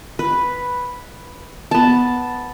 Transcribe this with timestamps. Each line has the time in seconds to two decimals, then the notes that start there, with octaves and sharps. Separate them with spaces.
0.19 B4
1.71 B3 A5